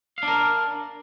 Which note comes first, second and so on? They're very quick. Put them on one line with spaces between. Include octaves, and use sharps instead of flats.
F5 D4 A#4